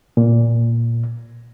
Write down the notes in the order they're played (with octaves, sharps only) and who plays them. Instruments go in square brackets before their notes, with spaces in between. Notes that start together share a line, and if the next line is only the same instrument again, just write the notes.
[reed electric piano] A#2